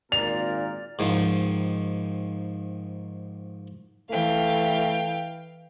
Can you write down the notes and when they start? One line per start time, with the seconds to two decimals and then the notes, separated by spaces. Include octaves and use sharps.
0.12 G#1 A#2 A#4 D5 A6 F7
0.99 G#2 D#3 F3
4.11 E3 A3 F5 G5